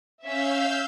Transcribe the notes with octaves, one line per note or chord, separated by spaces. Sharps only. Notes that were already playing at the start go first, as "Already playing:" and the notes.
C#4 E5 F5 E6 G6